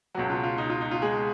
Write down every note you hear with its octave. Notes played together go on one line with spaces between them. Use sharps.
C#2 B2 F#3 F#4
F4
F4
D#4
F4
D#4
F4
G#3 G#4